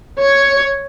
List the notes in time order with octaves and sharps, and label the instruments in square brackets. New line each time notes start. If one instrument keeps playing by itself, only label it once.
[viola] C#5